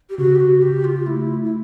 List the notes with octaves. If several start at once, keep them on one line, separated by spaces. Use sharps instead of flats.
G4
C#3 F#4
G4
F#4
C#3 G4
F4
A3 E4
E4